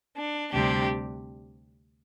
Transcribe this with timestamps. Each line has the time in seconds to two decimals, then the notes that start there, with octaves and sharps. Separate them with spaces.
0.17 D4
0.52 D2 C3 G3 C4 D4 G4